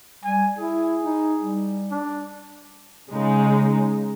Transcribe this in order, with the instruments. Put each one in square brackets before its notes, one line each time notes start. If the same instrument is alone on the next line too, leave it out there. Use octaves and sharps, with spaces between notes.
[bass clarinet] G3 [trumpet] G#5
[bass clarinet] E4 [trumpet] G#4
[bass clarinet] D#4
G3
[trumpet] D4
[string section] C#3 G#3 D#4